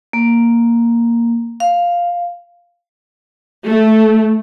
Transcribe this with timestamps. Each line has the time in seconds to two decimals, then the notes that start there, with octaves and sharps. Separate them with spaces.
0.13 A#3
1.60 F5
3.68 A3